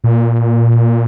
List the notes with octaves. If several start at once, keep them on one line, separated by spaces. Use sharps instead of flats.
A#2